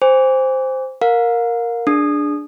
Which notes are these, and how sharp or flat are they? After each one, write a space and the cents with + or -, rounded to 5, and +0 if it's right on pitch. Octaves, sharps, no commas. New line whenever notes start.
C5 +0 G#5 -35 D6 -30
A#4 +0 F5 +35
D4 +0 G#4 +0 D#6 -20